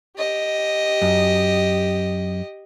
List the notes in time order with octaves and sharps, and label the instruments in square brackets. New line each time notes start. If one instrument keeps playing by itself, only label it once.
[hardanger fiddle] G4 D#5
[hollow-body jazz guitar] F#2